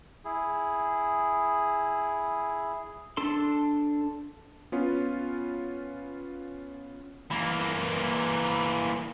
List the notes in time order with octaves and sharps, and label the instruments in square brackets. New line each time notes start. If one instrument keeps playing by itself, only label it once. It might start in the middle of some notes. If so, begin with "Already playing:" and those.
[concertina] E4 G#4
[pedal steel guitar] D4 A4 C6
[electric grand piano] B3 C#4 F4
[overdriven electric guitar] E3 A#3